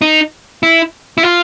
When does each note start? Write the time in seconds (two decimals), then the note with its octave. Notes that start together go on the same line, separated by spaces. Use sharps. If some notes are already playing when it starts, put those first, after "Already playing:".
0.02 D#4
0.63 E4
1.18 E4
1.23 F4